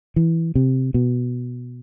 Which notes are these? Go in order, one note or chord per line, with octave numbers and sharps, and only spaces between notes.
E3
C3
B2